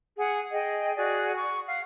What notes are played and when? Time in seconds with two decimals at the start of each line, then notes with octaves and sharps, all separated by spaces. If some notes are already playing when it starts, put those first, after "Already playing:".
0.17 G#4 F#5
0.52 G#4 D#5 G5
0.96 F#4 G#4 D5
1.37 F#5 C#6
1.66 F5 F#5